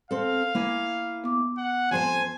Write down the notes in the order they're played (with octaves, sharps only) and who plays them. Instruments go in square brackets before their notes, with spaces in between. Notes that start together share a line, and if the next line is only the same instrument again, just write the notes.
[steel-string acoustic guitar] C4 A4 [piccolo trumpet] F5
[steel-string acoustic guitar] A#3 E4 G#5
[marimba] B3 D6
[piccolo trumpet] F#5
[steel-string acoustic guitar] F2 C5 A5 [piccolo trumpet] G#5